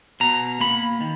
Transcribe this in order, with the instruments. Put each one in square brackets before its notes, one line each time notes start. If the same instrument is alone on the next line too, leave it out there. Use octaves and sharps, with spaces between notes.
[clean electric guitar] B2 A#5
A#3 B5
D#3